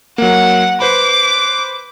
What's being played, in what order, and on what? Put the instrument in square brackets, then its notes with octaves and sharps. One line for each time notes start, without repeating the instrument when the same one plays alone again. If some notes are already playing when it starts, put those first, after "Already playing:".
[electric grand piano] F#3 A#3 [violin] F#5
[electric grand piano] B4 C5 B5 [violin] D6